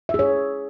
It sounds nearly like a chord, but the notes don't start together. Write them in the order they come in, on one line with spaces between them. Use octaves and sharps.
E5 G#4 C#5